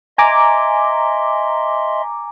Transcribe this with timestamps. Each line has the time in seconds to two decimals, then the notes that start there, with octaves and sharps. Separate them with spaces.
0.18 D#5 E5 G#5 A#5 C6 D6